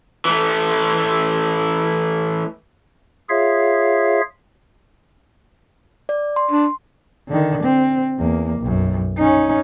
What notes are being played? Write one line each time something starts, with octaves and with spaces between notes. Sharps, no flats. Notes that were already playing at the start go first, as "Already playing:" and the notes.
E3 A3
F4 G#4 C#5 E5 F5
D5
C6
D4
D3 D#3
C4
E2 A#3
B1 F#2
C#4 D#4